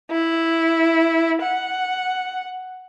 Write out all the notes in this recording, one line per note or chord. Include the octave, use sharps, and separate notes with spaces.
E4
F#5